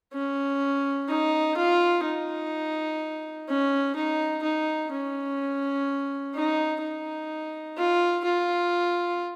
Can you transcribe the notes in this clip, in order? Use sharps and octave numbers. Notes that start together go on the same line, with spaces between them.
C#4
D#4
F4
D#4
C#4
D#4
D#4
C#4
D#4
D#4
F4
F4